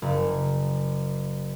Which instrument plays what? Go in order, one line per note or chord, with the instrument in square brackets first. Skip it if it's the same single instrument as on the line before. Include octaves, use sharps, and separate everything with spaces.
[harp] F#1